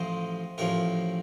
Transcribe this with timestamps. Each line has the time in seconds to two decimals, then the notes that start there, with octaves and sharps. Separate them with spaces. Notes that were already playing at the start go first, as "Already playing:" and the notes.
Already playing: A1 A2 F3 C5 D#5
0.58 A1 A2 F3 A#4 C#5